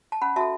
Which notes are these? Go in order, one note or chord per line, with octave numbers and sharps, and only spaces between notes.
A5
C#4 F#5 B5
F#4 A4 E5 A5